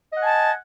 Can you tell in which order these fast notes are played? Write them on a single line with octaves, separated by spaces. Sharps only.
D#5 F#5 G#5 A5